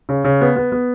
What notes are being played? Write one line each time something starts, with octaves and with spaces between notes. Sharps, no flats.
C#3
C#3
B3
B3
B3